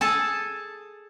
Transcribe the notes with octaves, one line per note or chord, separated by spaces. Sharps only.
G#4 A4 A5